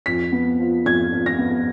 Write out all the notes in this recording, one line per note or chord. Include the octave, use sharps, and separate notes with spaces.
F2 B6
B3
F3
F2 G#6
F2
A#6
B3